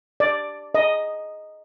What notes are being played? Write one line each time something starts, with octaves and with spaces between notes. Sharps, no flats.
D5
D#5